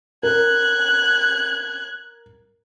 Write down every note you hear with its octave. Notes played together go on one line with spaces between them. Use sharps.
A#4 F#6 G#6